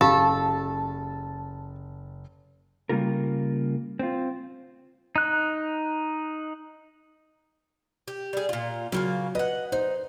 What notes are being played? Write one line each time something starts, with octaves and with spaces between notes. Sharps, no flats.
F#1 F4 G4 A4 F5 A5
C#3 G3 A#3 F4 A#4
C4 F4
D#4 F#6
G4
G3 G#4
A#2 F4
C#3 F#3 A#3 F4
B4 D#5 F#5
D#4 C5